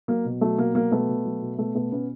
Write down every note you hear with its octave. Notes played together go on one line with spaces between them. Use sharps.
F#3 A#3
B2
F#3 A3
B2 A#3
F#3 A#3
B2 A3 B3
B2
F#3
B2
B2 A3 B3
B2 A3 B3
B2 B3 C#4